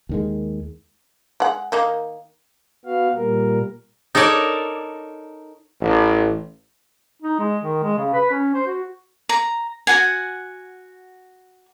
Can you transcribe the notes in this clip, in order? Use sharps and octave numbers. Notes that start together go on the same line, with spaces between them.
D#2 D#3 G#3
G#3 F#5
D#3 A#3 D#4
B3 F#4 F5
A#2 G3 A#4
D#4 A4 A#4 C#5 D5
A1
D#4
G#3
D#3
G#3
C#3
B4
C#4
C5
F#4
A#5
F#4 G#4 F#5 G#5